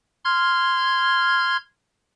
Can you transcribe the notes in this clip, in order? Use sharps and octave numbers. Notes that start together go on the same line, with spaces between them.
C6 F6 G#6